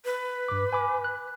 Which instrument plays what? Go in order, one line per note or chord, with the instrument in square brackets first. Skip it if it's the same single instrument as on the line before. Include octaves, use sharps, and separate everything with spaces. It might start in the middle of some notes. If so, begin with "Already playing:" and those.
[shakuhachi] B4
[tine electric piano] G2 D6
G#5 B5 D6
F#6